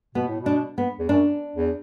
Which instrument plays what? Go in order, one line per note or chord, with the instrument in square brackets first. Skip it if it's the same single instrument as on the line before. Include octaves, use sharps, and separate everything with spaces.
[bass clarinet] B2 [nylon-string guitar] B3
[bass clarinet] A2
B2
[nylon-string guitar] D4
B3
[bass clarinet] E2
[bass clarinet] F#2 [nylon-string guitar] D4
[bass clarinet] E2